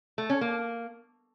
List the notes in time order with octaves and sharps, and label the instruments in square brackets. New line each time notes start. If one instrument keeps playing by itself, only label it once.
[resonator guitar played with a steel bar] A3
C#4
A#3